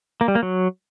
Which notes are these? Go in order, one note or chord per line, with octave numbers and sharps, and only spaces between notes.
A#3
G3
A#3
F#3